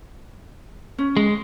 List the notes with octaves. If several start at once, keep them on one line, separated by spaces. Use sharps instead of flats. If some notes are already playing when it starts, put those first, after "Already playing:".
C#4
G#3